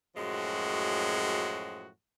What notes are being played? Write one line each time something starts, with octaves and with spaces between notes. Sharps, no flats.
F#2 A2 F3 G#3 F#4